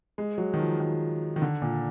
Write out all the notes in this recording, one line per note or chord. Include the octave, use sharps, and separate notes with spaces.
G#3
F#3
D#3
F3
D#3
D#3
D3
A#2